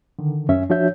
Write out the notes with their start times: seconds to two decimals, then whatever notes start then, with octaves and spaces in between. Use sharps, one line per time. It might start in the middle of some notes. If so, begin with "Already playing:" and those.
0.19 D3 D#3
0.49 F#2 C#4 E5
0.70 F3 D4 F#4 C#5 E5 G6